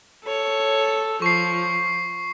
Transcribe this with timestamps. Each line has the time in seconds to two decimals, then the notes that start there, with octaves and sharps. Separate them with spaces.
0.25 A4 C#5
1.22 F3 C#6 C7